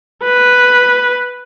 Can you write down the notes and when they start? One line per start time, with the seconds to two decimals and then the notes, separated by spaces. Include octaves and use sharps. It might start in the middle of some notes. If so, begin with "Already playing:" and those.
0.24 B4